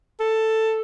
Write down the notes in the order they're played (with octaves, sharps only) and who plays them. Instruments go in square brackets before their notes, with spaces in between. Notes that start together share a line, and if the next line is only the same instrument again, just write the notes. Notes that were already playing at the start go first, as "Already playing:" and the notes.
[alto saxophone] A4